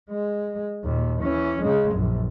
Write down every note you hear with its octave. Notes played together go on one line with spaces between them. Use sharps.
G#3
D#2 A#2
E3 C#4
C#3 G#3
A#1 F#2